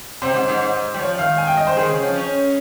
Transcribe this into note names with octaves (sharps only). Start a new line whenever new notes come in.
C3 C5
G#2
G#2
G#2
G#2
G3
F3 C#5
D#3 F5
G#5
G5
D#5
C5
D#3 G#4
C#3
F3
C#4